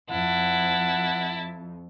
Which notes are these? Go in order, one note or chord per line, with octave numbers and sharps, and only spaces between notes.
F2 E4 F#5 A5